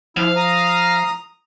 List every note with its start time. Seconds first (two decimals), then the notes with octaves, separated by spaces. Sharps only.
0.17 F3 E4 F5
0.36 A#5 D#6